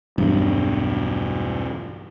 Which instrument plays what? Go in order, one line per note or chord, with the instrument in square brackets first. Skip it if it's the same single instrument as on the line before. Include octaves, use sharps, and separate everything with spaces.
[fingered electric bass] B1 E2 [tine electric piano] G2